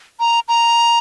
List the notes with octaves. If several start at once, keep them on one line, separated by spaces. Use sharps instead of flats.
A#5
A#5